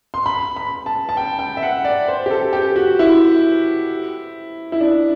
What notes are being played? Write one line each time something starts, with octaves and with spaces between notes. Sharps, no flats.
C6
B5
B5
A5
A5
G5
G5
E5
F#5
D5
C5
G4
A4
G4
F#4
E4
E4
D4